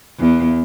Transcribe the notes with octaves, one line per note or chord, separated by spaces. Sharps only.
E2